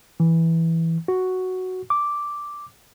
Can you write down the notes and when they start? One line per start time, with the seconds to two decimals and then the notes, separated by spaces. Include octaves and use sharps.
0.20 E3
1.08 F#4
1.90 D6